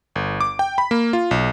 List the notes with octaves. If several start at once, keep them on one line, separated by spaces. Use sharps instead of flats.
G1
D6
G5
B5
A#3
F4
B1